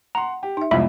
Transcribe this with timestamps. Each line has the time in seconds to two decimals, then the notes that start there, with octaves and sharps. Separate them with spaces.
0.15 F#5 A#5 C6
0.43 G4
0.57 D#4 E5
0.71 C2 F2 G#3 B3 C4 F4 E5 B5